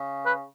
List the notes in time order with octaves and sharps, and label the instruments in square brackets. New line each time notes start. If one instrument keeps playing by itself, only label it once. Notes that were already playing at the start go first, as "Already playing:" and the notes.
Already playing: [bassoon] C#3
[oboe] B4